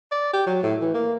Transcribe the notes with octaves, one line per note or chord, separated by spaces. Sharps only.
D5
G4
F#3
A2
E3
A#3